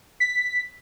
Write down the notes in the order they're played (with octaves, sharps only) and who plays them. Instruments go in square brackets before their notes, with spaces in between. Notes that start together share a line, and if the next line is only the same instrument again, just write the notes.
[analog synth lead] B6